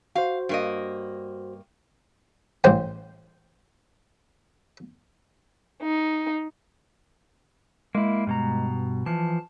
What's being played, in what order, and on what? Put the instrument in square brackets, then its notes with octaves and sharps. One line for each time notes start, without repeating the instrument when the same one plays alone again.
[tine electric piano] F#4 C5 [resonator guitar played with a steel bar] F5
[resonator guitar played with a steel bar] G2 A#3 D#5
[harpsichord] A1 C5 G5
[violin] D#4
[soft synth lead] G#3 [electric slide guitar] A#3 E4
[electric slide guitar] G2 B2 A#5
[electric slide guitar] E3 F3 [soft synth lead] A5